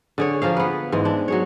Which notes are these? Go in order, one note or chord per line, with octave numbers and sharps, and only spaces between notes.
D3 G#4 C#5
F3 A#3 G#4 F5
B3 B4
G#2 E3 G#3
D4
F#3 G#4 C#5